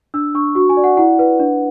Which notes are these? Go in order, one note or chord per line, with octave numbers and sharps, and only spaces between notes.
D4 E6
D4 C#6
F#4 C#6
G#5
D5
F#5
E4 F#5
B4
D4